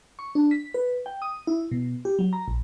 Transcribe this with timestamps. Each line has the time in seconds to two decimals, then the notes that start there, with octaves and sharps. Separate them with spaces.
0.19 C#6
0.35 D4
0.51 B6
0.74 B4
1.06 G5
1.22 D#6
1.47 E4
1.71 B2
2.05 G4
2.19 F#3
2.33 A#5
2.48 A#1